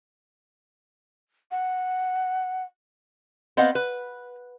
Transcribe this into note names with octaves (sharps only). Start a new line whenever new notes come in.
F#5
B3 C4 D#5 F5 F#5
B4